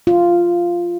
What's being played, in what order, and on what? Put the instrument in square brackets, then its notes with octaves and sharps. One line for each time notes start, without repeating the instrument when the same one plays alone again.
[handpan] F4